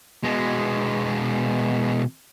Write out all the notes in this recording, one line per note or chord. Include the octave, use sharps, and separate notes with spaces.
B2 G#3